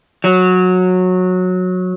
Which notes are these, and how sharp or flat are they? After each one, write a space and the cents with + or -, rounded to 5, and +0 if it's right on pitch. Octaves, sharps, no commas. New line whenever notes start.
F#3 -15